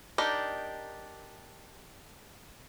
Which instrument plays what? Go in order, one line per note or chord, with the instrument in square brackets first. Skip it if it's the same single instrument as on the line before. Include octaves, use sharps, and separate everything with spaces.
[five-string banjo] D4 D#4 G4 A#4